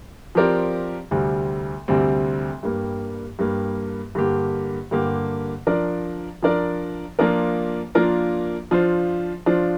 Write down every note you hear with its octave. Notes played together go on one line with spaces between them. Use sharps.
F3 C4 G4 A#4 D5
D2 C3 G3 C4
D2 C3 G3 C4
G2 G3 A#3
G2 G3 A#3
G2 D3 A#3 G4
G2 D3 A#3 G4
F3 D4 A#4 D5
F3 D4 A#4 D5
F3 A#3 D4 F4 A#4
F3 A#3 D4 F4 A#4
F3 D4 F4 C5
F3 D4 F4 C5